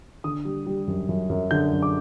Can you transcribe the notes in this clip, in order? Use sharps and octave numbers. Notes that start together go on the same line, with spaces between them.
D3 D#6
G3
G3
F#2
F#2
F#2
D3 G6
F#2
D6